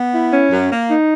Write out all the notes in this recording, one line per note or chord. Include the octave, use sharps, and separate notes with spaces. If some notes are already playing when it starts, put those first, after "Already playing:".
Already playing: B3
E4
C#4
F#2
A#3
D#4